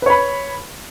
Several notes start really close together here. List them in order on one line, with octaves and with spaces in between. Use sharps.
B4 C#5 B5